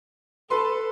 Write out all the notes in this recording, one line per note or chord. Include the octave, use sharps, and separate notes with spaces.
A4 B4 C6